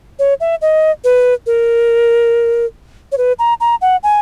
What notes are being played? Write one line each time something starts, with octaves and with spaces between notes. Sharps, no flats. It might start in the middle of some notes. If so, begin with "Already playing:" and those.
C#5
E5
D#5
B4
A#4
C#5
B4
A#5
A#5
F#5
G#5